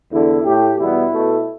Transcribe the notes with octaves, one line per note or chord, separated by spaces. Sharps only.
E2 D3 A3 E4
A2 A3 G4
E2 B2 G3 B3 E4
B2 A3